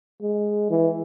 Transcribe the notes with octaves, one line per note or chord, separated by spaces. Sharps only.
G#3
E3